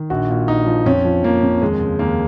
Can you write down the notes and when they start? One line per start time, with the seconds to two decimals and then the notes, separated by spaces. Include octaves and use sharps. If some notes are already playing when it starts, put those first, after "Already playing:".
Already playing: D#3
0.10 A#1 F#4
0.29 A#2
0.48 A#1 D#4
0.66 F3
0.86 F2 C#4
1.05 F3
1.23 F3 A#3
1.43 F2
1.62 D#2 G#3
1.80 C#3
1.99 D#2 A#3